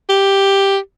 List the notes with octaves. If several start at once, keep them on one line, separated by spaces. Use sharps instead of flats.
G4